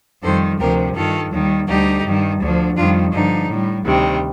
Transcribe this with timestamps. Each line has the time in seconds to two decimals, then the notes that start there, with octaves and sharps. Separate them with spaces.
0.23 F2 D#3 G3 A4 C5
0.60 D2 C3 F3 G4 A#4
0.95 G2 D#3 G3 F4 A4
1.31 D#2 D#3 G3
1.68 D2 D3 G3 D#4 G4
2.04 G2 D#3 G3
2.41 D2 D3 F3
2.76 F2 D#3 G3 D4 F4
3.12 G2 D3 F3 D#4
3.48 A2 G3
3.84 D2 C3 D#3 G3